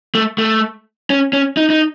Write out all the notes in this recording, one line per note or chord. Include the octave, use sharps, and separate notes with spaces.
A3
A3
C#4
C#4
D#4
D#4